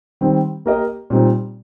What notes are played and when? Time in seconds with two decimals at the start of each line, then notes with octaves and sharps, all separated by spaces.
0.21 D#3 G3 C4
0.66 A#3 G4 A#4 D#5
1.10 A#2 G3 C4 D#4